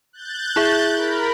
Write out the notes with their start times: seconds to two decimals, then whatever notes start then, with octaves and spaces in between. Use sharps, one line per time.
0.13 F#6 G6 A6
0.56 E4 G#4 E5
0.91 A#4 B5